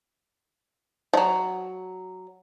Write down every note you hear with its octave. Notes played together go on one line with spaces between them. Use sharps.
F3 F#3